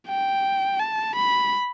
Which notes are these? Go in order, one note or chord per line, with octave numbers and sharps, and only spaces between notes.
G5
A5
B5